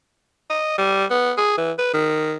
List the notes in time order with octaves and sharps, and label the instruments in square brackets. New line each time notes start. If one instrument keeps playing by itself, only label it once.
[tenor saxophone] D#5
G3
B3
G#4
E3
B4
D#3